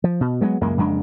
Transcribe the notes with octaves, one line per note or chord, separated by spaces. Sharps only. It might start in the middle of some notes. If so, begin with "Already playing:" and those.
F3
B2
F#3 G#3 A3 B3
C#2 F#2 G#3 A#3
F#1 F2 G#3 D4